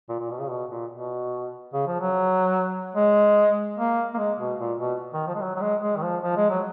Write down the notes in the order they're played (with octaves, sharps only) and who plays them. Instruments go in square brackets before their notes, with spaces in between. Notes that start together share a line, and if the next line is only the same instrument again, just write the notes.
[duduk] A#2
A#2
B2
C#3
B2
A#2
B2
C#3
F3
F#3
G#3
A#3
A#3
G#3
B2
A#2
B2
D#3
F3
G#3
F#3
F#3
G#3
G#3
D#3
F3
F3
G#3
F#3